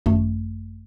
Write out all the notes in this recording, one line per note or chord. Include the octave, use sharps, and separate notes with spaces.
G#1 F#2 A3